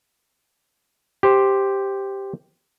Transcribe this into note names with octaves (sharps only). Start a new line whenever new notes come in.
G4 C5